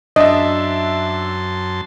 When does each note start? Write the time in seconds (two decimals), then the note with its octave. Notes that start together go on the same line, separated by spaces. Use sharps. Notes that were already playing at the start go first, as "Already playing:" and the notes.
0.16 F#2 D4 D#5 E5 A5 C6